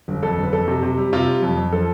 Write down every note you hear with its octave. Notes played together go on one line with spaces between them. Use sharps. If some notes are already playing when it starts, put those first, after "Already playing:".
G1
F2 A4
G1
B4
F2 A4
C3
C3
G3
C3 F4
G3
F2
F2
F3 A4